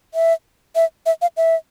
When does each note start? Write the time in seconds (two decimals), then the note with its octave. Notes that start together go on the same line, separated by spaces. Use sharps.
0.14 E5
0.75 E5
1.06 E5
1.22 F5
1.37 E5